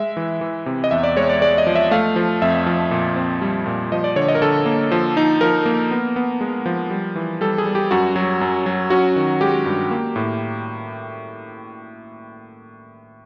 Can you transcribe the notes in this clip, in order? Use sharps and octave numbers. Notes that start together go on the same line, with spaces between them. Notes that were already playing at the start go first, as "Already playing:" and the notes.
Already playing: G#3 E5
E3
E3
C3
D#5
E2 E5
D5
G#3 C#5
D5
G#3 D5
D#5
F3
E5
A3 F5
F3
F2 E5
F3
A#2
C4
G3
A#2
F3 D#5
D5
D3 C#5
D#5
A#4
D3 A4
A#3
F3
D#4
F3 A#4
A#3
B3
B3
G#3
F3
G3
E3
G3 A4
G#4
G3
G4
F#2 F#4
F#3
F#2
F#3
C#4 F#4
D#3
G#3 G4
G2
A#3
A2